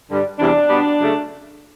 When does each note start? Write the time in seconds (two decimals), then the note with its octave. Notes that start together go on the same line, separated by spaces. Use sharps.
0.09 G2 D3 G3
0.39 E2 C3 E3 G3 D4
0.70 B2 G3 B3
1.00 C#3 F#3 A3